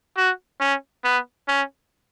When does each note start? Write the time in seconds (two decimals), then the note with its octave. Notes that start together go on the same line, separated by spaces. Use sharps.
0.17 F#4
0.61 C#4
1.04 B3
1.48 C#4